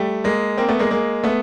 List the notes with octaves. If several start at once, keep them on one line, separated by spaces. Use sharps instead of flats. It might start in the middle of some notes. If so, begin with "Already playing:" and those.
Already playing: G3 A3
G#3 A#3
A#3 C4
A3 B3
G#3 A#3
G#3 A#3
A3 B3